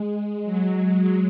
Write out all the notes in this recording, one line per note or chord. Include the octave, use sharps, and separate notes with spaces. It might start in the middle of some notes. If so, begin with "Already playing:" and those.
Already playing: G#3
F#3